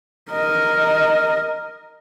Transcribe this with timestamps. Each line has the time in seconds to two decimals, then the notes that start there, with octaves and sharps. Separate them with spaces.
0.31 A#4 D#5